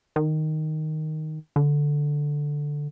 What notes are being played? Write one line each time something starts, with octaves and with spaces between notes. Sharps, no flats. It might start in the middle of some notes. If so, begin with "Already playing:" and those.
D#3
D3